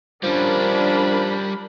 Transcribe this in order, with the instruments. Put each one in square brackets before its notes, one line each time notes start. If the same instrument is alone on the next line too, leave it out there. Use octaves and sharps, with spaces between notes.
[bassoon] F3 [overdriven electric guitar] G3 C#4 [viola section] D4 A#4 B5